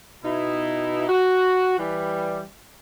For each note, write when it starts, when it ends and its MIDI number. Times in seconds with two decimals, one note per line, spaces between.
0.24 1.07 47
0.24 1.07 63
0.24 1.07 64
1.08 1.76 66
1.78 2.42 52
1.78 2.42 55